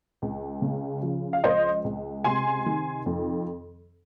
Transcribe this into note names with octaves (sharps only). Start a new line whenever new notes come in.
C#2
C#3
F3
F5
C#2 C5 D#5
C#2
C3 G#5 C6
D#3
F2